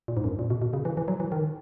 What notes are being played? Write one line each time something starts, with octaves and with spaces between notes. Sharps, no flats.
A#2
G#2
F#2
A#2
B2
B2
C#3
E3
E3
F#3
E3
D#3